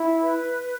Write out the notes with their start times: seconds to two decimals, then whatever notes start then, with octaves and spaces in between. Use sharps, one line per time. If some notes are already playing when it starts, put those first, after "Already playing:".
Already playing: E4
0.21 B4